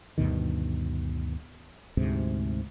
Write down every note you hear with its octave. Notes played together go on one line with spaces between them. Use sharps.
D2 G2 B2 D#3
D2 G#2 C3